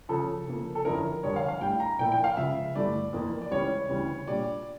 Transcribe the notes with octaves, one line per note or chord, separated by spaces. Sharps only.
C#3 F3 C#4 A4
C#3 F3 A#3
A4
F2 D3 F3 C#4 E4 A#4
F2 D3 G3 D4 C#5
F5
F5
A2 G3 D4 G5
A#5
A#2 F3 A#3 E4 G5
G5
F5
C#2 C#3 F3 E5
G2 D3 A3 E4 D5
F2 E3 A#3
D5
C#2 C#3 E3 G3 C#4 C#5
D2 C#3 E3 G3 C#4
A#2 G3 D4 D5